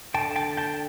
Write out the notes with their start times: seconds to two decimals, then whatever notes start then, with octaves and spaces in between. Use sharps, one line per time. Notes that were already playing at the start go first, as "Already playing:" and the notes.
0.14 D3 G5 A5
0.36 G5 A5
0.57 G5 A5